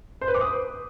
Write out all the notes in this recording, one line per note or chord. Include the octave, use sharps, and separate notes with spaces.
C5
B4
D6
D#6